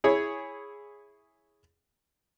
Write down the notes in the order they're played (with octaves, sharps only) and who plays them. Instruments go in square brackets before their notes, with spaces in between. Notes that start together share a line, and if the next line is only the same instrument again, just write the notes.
[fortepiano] E4 G#4 C#5